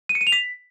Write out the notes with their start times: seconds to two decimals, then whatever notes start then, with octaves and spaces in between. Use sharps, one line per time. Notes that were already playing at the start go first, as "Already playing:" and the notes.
0.09 D#7
0.15 C#7
0.21 D#7
0.27 F7
0.32 B6